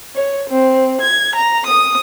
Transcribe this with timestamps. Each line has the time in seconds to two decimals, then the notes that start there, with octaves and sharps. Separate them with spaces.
0.15 C#5
0.50 C4
1.01 G#6
1.35 A#5
1.66 D#6